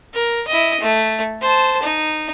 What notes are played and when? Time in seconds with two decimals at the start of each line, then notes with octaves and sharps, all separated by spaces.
0.14 A#4
0.48 E4 D#5
0.80 A3
1.41 C5 A5
1.82 D#4